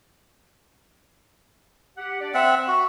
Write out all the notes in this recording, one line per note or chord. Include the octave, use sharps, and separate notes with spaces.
G4 F#5
D4 G4 D5
C4 E5 F#5
F#4